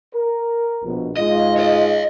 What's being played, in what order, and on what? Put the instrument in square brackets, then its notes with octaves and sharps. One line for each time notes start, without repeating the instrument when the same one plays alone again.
[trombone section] A#4
A#1 B2
[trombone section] G#2 G#3 F4 [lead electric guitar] D#5
[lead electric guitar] C#5 D#5